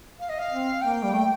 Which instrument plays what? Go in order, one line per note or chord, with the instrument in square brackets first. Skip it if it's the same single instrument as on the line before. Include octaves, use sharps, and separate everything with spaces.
[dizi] F5
D#5
F5
[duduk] C4
[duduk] A#3 [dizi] G5
[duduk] G3
A3